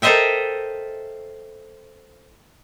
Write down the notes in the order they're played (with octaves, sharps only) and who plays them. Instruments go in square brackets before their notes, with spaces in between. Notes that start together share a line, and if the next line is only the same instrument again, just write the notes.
[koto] A4 A#4 C5 D#5 E5 G5